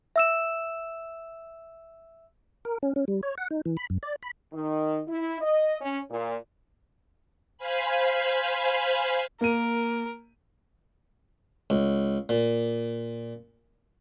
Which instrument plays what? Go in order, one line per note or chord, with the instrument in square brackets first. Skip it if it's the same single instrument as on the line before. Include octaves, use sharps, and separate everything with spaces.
[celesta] E5 E6 E7
[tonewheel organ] A#4
C#4
C#4
G3
C#5
F#5
D#4
E3
B5
F#2
D5
B5
[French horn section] D#3
E4
D#5
C#4
A#2
[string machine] C5 F5 G#5 B5
[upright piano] A#3 D#7 [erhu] A#4
[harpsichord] C#2
A#2